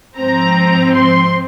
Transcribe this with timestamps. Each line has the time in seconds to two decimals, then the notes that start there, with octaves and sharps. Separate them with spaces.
0.18 G#2 F3 C4 A#5
0.95 C6